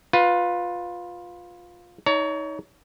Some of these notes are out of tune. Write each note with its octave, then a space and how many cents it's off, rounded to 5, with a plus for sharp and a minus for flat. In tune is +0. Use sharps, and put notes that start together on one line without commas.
F4 +15 B4 +0
D#4 +25 C#5 +30 A#5 -35